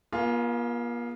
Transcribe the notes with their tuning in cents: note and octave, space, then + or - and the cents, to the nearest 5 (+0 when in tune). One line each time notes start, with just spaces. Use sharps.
A#3 +45 F4 +0 G#4 +0